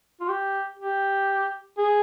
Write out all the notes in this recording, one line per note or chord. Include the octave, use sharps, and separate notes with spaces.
F4
G4
G4
G#4